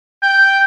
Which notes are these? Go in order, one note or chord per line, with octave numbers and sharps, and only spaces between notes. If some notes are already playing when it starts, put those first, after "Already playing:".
G5